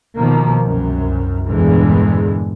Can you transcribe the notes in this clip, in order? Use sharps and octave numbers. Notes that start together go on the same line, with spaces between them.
B2 D#3 F3 A#3
C2 F#2
E2 G2 A#2 D3 E3 G#3